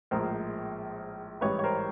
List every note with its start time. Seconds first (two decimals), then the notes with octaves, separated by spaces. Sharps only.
0.11 A#1 A2 F3 G#3 A#4 C5
1.41 A1 G#2 E3 G3 B4 C#5
1.59 C#5
1.64 A#4 C5